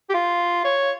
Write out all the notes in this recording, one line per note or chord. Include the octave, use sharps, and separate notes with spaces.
G4
F4
C#5